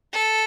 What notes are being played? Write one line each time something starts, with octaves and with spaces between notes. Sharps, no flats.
A4